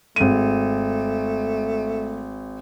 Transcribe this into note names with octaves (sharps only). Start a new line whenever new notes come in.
G#1 A3 D#7